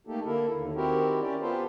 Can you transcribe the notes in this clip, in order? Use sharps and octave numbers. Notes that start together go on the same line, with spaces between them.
A3 A#3 D#4 G4 A4
D3 A#3 E4 A4 A#4
D#2 D3
D#3 C4 E4 F#4 G4 A#4
C#4 G4 A#4 D5
B3 F4 G4 A4 B4 C5